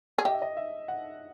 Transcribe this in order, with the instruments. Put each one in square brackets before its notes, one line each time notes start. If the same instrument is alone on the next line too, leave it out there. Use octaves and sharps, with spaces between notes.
[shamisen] G#4
[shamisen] G4 [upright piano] D#5
[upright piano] E5
D#5
E5
F#5